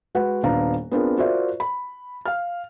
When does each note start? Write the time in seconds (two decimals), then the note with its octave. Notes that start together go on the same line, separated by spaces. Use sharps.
0.15 G#3 F#4 B4 F#5
0.43 D#1 B3 D4 F5 A#5
0.91 B3 C4 D4 F4 G#4 A#4
1.18 F4 F#4 A#4 C5 D5 E5
1.60 B5
2.26 F5 F6